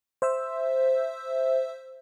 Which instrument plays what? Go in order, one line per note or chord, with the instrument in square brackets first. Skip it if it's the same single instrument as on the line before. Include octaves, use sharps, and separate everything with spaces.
[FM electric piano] C5 E5 E6